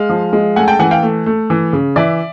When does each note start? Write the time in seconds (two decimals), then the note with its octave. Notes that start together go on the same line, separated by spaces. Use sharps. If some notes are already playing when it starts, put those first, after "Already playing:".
Already playing: G#3 F5
0.09 F3
0.33 G#3
0.56 A3 F#5 G#5
0.68 G5 A5
0.79 E3 F#5 G#5
0.91 F5 G5
1.03 A3
1.26 A3
1.50 E3
1.73 C#3
1.96 E3 D5 E5